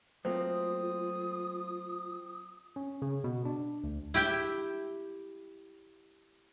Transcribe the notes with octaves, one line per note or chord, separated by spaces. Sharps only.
F#3 A3 A#3 C4 F4 D#6
C#4
C#3
B2
D4
D2
E4 G4 E5 G5